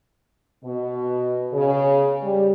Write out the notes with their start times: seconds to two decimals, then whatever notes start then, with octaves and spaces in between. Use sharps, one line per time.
0.64 B2
1.54 C#3
2.23 G3